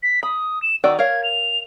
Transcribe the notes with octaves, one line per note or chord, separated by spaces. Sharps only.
B6
B5 D#6
E7
D#3 F#4 D5 E6
A#4 C#5 F5 G#6
F7